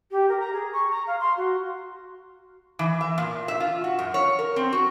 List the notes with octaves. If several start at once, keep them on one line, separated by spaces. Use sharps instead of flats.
G4
A#4
A#5
G#4
C#6
A#5
F5
C6
F#4
E3
E5
A#2
E5
F4
F#4
F#2
C#5
A#4
C4
F#4